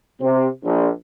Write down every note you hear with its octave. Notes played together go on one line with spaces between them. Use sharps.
C3 C4
A#1